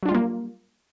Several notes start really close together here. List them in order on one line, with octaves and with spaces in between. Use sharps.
F#3 D4 F4 G3 A#3